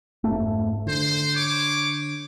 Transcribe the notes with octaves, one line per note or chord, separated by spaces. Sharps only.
F1 G#2 A3
D3 C5
C#5 D6